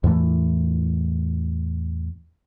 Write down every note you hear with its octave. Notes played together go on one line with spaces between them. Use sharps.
E2 A2 E3 A3